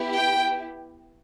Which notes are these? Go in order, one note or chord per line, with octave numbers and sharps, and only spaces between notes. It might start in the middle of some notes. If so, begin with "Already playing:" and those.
Already playing: B3 E4 G4
G5